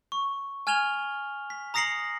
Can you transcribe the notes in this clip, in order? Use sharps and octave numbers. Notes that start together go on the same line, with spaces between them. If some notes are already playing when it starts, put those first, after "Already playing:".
C#6
G#5 F6 G#6 E7 F7 G7
B6
A#5 D#6 A#6 C7 C#7 F#7